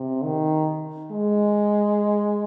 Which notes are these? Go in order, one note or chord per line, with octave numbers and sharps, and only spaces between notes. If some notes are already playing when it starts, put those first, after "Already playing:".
Already playing: C3
D#3
G#3